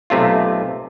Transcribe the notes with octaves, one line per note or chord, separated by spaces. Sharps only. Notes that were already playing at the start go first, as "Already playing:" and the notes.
B1 C3 A3 F4